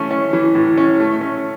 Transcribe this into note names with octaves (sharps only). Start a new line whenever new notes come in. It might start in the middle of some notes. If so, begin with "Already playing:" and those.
Already playing: E3 A3 C#4
C#4
E3
A2
C#4
A3
C#4